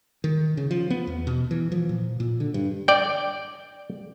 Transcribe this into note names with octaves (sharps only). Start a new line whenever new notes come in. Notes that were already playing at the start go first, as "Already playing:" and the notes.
D#3
C#3
F3
B3
E2
B2
E3
F3
A#2
A#2
D3
G2
D5 G5